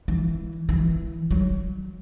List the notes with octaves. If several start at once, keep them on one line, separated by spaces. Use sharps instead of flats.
E3
E3
F#3